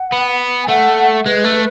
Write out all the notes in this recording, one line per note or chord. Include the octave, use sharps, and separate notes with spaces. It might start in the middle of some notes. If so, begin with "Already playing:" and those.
Already playing: F#5
B3
G#5
A3 F#5
G#3 B4
A3